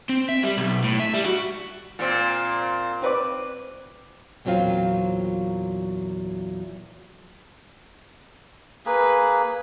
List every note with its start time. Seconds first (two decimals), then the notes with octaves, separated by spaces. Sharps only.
0.09 C4
0.29 E5
0.43 G3
0.57 B1
0.84 A2
1.00 E5
1.14 G3
1.26 F#4
1.99 A#2 C4
3.02 C4 B4 D5
4.45 E2 A#2 F#3 C4 F4 F5
8.86 A#3 G#4 B4